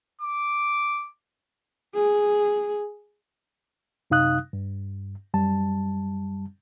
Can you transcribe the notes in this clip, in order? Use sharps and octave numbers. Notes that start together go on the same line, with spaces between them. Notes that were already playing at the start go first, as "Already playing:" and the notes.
D6
G#4
F#2 C3 D#4 F5 D#6 F#6
G2
F#2 G3 A5